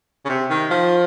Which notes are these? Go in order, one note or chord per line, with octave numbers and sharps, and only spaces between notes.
C#3
C3
D#3
F3